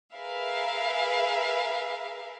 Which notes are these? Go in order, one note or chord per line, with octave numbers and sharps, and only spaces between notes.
G#4 A#4 B4 E5 F5